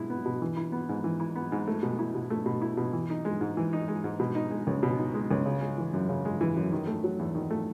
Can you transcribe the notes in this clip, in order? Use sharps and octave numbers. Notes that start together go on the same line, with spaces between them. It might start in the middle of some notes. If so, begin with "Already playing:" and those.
Already playing: B2 G#3 E4
B3
B2
E3
E4
B3
G#2
E3
E4
B3
G#2
A3
B2
E4
B2
A3
B2
E4
B2
E3
D#4
G#3
G#2
E3
D#4
G#3
G#2
B2
D#4
G#3
C#2
B2
D#4
G#3
C#2
C#3
G#3
E3
F#2
C#3
G#3
E3
F#2
D#3
A3
F#3
E2
D#3
A3